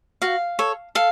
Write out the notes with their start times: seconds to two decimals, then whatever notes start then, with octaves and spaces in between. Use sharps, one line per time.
0.22 F#4 F5
0.59 A4 C#5
0.95 A4 F5